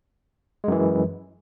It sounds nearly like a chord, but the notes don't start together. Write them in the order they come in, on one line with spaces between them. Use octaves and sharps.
G#3 F#2 E3